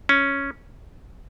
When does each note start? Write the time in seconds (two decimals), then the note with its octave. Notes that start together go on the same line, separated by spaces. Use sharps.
0.09 C#4